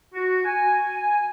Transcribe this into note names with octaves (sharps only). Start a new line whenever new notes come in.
F#4
G#5